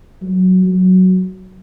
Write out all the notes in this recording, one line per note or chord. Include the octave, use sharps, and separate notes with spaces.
F#3
F#3